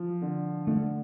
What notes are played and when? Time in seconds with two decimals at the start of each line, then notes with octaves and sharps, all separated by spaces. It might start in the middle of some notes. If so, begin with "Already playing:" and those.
Already playing: F3
0.22 D3
0.67 D3 A3